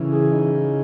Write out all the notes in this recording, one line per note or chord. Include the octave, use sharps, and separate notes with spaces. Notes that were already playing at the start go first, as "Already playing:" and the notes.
Already playing: C#3 E3
G#4
D#4